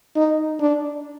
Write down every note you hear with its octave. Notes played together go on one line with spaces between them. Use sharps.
D#4
D4